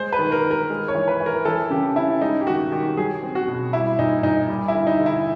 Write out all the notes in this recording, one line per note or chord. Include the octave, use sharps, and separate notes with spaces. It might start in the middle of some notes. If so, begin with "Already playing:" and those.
Already playing: G#3 C5
B4
D#3
A#4
D#3
A#4
G#3
C#5
E3
B4
E3
A#4
E3 A4
C#3 G4
C#3 E4
G#3 D#4
G4
D#3 F#4
D#3 G4
F#3 G#4
C4
F#4
B2
G3 E4
A#2 D#4
A#2 D#4
G3
E4
D3
D#4
D3
E4